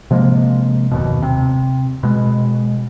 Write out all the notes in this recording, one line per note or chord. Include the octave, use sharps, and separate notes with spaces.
C3 F3 G#3 A#3
F#1 D#2 B2
C3
B2 G#3